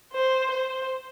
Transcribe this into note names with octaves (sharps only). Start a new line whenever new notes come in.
C5
C5